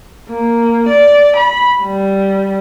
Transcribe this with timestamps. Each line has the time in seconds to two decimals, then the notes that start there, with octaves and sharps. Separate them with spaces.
0.29 A#3
0.88 D5
1.36 B5
1.82 G3